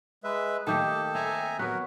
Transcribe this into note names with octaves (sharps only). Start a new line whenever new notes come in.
G#3 B4 E5
D#3 A3 A#3 G4 A4 G5 D#6 G6
C4 E5 G#5 A#5
F#3 B3 F#4 A#4 B4 F#6 B6